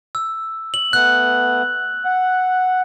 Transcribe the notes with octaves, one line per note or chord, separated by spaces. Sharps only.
E6
F#7
A3 B3 F#6
F#5